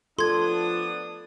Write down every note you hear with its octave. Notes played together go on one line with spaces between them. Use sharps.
F3 B3 D4 A4 C6 D#6 G#6